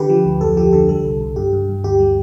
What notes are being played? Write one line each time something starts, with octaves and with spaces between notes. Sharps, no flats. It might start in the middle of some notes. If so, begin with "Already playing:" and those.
Already playing: D3 G4 B4
F3
D2
F2 A4
F3 G4
D3 A4
G3 A4
C2
C2
G2 G4
G2
G2
D2 G4
G3